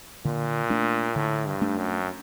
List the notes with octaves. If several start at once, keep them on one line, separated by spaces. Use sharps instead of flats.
A#2 D3
A3 D4
A2 D3
G2
A3 D4
F#2